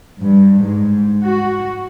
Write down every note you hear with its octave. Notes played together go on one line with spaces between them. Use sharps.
G2
G#2
F#4